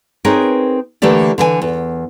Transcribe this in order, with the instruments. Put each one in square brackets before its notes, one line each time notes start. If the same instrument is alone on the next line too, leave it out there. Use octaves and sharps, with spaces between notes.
[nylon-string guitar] C4 D#4 G#4 A#4 B4 C#5
D3 E3 A3 A#3 G4 D5
D3 E3 E5 G#5
E2